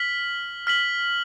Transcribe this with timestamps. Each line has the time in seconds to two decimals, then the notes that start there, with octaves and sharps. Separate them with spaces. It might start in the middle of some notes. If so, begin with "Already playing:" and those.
Already playing: F6 B6 F#7
0.67 F6 B6 F#7